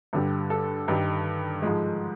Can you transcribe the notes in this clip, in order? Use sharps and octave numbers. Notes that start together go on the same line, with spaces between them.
G2 D3 G3
A4
G2 D#3 G3
G#2 F3 G#3